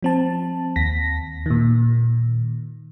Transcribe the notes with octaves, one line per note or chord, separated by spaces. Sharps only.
F3 C4 A5
D#2 A#6 B6
A#2 D#3